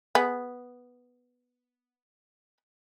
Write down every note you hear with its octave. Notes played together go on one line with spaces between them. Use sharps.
B3 G#4